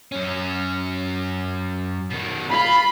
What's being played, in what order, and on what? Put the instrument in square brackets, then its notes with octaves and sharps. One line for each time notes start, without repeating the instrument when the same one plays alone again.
[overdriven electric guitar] F#2 C#4
B2 D#3
[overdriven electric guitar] F4 [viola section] B5